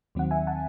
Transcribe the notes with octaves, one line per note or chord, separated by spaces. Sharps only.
D#2 D#3 F#3 C4 F#5
E5 G#5
F#5 A5